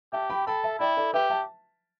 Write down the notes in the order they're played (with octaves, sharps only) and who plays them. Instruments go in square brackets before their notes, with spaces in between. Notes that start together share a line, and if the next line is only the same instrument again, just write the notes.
[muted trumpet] G4 [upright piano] E5 A5
[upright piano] G5 B5
[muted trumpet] A4 [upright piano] G5 B5
[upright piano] E5 A5
[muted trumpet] E4 [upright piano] D5 G5
[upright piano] A4 D5
[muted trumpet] G4 [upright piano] B4 E5
[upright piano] E5 A5